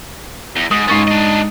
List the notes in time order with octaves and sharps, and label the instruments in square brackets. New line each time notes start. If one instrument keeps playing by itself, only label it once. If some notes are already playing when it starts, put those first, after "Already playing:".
[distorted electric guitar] E2
[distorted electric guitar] G#2 [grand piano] D#6
[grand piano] G#2 C#6 A6 [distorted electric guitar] C#4 F4
[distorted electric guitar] D4 D#5